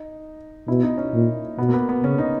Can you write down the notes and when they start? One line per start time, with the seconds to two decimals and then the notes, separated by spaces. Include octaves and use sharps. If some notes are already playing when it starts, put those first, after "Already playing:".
Already playing: D#4
0.68 B2 E4
0.83 D#4
0.97 C#4
1.13 A#2
1.58 B2 B3
1.68 A#3
1.74 B3
1.89 B3
2.03 C#3 C#4
2.18 D#4